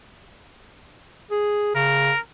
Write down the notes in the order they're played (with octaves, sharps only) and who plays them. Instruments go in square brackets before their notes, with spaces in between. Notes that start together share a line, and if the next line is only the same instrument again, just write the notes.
[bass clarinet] G#4
[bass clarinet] C#3 [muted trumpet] A#4